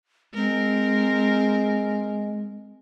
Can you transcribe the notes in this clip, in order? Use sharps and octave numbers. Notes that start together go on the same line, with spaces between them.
G#3 C4 A#4